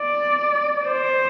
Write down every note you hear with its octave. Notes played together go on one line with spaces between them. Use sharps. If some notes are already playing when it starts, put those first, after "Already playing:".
Already playing: D5
C5